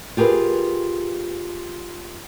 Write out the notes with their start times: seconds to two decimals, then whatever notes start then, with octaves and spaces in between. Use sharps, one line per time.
0.17 F4 G4 G#4 A#4 B4